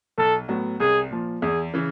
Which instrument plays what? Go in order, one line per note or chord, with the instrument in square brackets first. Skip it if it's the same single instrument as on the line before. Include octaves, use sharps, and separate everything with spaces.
[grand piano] B1 [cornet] A4
[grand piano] A2 F#3 B3
[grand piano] C2 [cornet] G#4
[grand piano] A#2 F3
[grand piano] E2 [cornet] G#4
[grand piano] C#3 E3